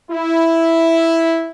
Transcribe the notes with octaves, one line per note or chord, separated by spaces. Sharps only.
E4